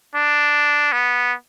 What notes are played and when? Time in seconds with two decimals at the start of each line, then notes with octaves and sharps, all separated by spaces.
0.15 D4
0.92 B3